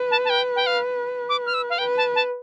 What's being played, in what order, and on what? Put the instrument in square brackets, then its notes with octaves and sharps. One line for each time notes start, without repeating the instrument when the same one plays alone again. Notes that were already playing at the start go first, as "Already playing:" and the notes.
Already playing: [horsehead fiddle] B4
[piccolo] A5
A5
G5
G5
F5
D6
F6
E6
F5
[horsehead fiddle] B4 [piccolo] G5
[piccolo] A5
A5